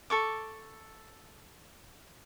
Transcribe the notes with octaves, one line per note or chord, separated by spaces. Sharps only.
A4 C#6 D6